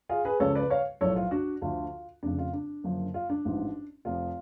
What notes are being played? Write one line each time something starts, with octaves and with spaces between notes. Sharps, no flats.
F4 G#4
G#4 B4
C#2 C#3 F3 A4 C#5
B4 D5
C#5 F5
B1 A2 F3 A4 C#5
F4
D4 F#4
D2 D3 F3 F4
F1 F2 C#3 D4
F4
D4
F#1 F#2 D3 F3
F4
D4
A1 G#2 F3
F1 F2 F3 F4